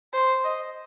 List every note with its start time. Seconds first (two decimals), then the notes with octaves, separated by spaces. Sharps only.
0.13 C5
0.44 D#5